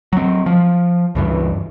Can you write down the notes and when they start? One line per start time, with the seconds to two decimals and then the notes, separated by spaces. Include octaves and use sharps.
0.13 F#3 C4
0.46 F3
1.15 C#2 G2 E3